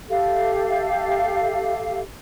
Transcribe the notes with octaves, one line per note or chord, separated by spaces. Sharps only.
G4 A4 E5 F5